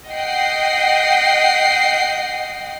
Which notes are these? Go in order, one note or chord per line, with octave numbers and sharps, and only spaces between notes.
D#5 F#5 G5 C7